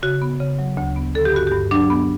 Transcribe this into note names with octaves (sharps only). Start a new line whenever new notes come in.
C#3 F#4
B3
C#3
F#3
D2
B3
D3 A4
G4
G2 F#4
G4
G2
F#3 D4
B3